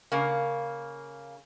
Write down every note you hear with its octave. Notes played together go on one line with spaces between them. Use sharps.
C#3 A#3